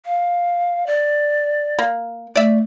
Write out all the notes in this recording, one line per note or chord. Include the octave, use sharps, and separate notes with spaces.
F5
D5
A#3
A3 D5 E5